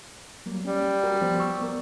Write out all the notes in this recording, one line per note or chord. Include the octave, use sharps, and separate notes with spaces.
F#3 G3 A#3
G3 C#4
F#4 A#4
F3 B3 C5
C#6 E6
B3 A#4